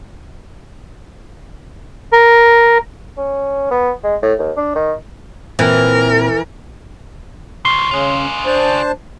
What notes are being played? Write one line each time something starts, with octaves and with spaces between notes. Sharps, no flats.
A#4
C#4
B3
G#3
A2
D#2
D4
D#3
A#2 E3 C4 A#4
C#3 F3 C6
C#3 C#4 F4 G#4
D4 C5 A5